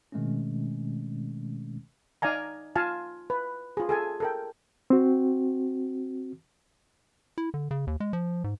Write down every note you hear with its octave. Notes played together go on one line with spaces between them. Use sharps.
B2 D#3 G#3 A3 C4 C#4
D#4 D5 F5 G#5 A#5
F4 F5 G#5 A5
B4
F4 G#4
G#4 A4 G#5 A5
A4 A#4 G5
C4 F#4
E4
D3
C#3
D#2
G#3
F3
G#2